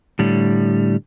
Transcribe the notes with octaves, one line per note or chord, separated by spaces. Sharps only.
A2 D3 G3